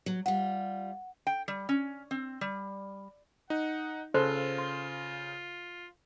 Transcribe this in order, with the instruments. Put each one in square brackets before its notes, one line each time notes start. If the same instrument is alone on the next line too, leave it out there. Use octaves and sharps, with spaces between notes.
[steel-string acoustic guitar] F#3
[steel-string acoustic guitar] G3 F4 [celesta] F#5
[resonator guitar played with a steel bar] G5
G3
C#4
C4
G3
[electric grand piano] D#4 [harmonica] F#5
[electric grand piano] C#3 [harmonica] F4 [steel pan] A4 C6 [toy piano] C5
[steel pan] C6